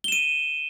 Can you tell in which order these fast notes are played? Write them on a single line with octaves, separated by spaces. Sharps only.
G7 E7 D#7